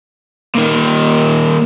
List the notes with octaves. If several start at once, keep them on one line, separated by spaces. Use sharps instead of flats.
A#2 D#3